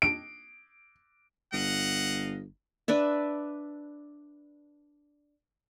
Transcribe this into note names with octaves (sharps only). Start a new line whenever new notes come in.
D7
G1 D#5 F5 F#5
D4 B4 D5 E5